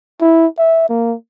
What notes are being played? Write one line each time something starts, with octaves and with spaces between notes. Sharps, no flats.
E4
E5
A#3